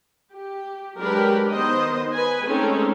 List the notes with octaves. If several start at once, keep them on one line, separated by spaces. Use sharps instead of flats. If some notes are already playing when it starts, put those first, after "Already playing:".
G4
F#3 G#3 D4 G4 A#4 B4
D#3 B3 C5 D#5
B4 G#5
G#3 A3 C4 C#4 D#4 A4